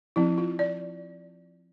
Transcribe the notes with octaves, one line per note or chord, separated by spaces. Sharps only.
F3 C4 E4
F4
D5